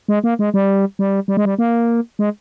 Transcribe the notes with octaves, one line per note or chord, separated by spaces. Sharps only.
G#3
A#3
G#3
G3
G3
G3
G#3
G3
A#3
G#3